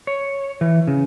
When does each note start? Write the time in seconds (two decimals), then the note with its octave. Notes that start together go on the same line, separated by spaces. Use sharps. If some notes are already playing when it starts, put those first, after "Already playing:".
0.07 C#5
0.61 E3
0.87 C#3